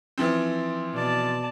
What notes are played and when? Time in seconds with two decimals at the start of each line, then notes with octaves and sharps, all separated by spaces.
0.18 E3 F3 C4
0.94 B2 D5 A5